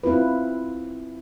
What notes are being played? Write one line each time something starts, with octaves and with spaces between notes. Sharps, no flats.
C4 E4 F4 B4